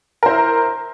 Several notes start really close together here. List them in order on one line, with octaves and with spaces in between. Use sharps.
A#4 C5 E4